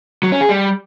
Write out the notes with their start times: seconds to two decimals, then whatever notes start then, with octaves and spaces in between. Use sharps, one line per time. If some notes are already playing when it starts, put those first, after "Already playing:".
0.23 F#3
0.32 C#4
0.41 G#4
0.49 G3